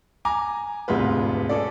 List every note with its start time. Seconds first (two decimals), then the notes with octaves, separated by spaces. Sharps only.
0.25 G#5 A#5 D6
0.88 E1 D2 G#2 C3 F4 B4
1.49 C#4 G#4 A4 D5